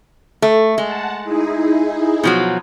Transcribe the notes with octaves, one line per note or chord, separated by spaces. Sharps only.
A3
G#3 F#5 A5
D#4 E4 G#4
B2 F3 F#3